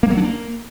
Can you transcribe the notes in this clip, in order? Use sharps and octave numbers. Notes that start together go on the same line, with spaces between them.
A#3
F#3
D4
A#3